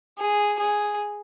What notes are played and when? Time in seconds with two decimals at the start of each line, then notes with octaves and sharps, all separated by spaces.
0.19 G#4
0.59 G#4